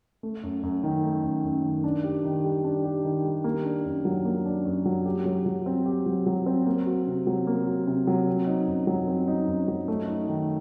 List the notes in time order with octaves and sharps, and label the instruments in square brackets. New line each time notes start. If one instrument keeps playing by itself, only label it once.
[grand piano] A3
F#2
F#2
D#3
A3
F#2
F#2
D#3
D4
G4
D#3
G3
D4
G4
D#3
G3
A#3
D4
F#2
F#3
A#3
D4
F#2
F#3
G4
F#3
F#3
C4
G4
F#3
F#3
C4
A#3
F#4
C3
F#3
A#3
F#4
C3
F#3
C4
D#4
F#2
F#3
C4
D#4
F#2
F#3
A3
D#4
D#3